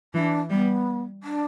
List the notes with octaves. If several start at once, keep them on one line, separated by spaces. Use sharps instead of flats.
E3 D4
G3 B3
D4